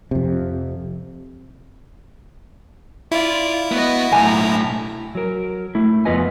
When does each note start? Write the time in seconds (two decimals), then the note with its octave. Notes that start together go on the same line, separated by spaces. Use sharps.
0.11 F2 C3
3.12 E4 F4 D5
3.72 B3 F#4 D#5
4.12 B1 A2 G#5 A#5
5.15 F#3 A#4
5.75 A3 E4
6.05 F2 B3 F4 B4 D#5 G#5